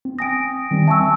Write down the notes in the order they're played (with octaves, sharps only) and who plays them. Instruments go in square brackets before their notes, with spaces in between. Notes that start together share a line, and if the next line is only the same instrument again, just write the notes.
[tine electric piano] C4
[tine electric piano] G5 G#5 D#6 [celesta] A#6 D7
[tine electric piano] D#3 G3 C4
[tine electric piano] E5 G#5 C#6 [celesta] A5 E6